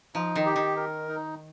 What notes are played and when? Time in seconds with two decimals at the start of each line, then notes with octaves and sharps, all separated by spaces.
0.15 F3 D#4
0.36 D#3
0.46 G4
0.56 D#3
0.77 A#4
1.08 D#4